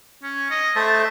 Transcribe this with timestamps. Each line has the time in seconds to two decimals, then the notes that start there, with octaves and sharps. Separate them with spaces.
0.23 C#4
0.50 D#5
0.76 A3 C5 E5 A5